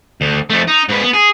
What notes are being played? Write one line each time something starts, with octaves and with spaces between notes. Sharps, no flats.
D2
F2 A3
D#4
G#2 B4
B3
G#4